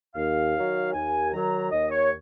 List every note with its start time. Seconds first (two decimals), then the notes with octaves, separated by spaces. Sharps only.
0.15 D#2 F5
0.54 D#3 F#3
0.93 D#2 G#5
1.32 D#3 F#3 A#5
1.71 D#2 D#5
1.91 C#5